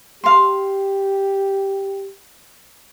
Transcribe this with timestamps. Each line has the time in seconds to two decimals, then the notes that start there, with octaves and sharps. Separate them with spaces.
0.24 G4 F5 C6